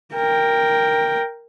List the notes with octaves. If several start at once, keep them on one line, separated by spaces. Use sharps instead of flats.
A#4 G5